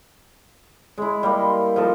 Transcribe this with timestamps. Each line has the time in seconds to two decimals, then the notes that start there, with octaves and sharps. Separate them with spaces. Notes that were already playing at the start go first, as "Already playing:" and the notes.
0.98 G#3 E4
1.23 G3 A#3
1.41 C6
1.76 F3 D#4 A4